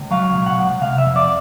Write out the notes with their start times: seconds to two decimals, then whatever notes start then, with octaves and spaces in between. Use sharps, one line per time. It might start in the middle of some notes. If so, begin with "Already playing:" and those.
Already playing: C#2
0.11 F#3 F5
0.35 B2
0.46 F#5
0.58 C#2
0.81 C3 F5
0.98 E5
1.05 F2
1.16 D5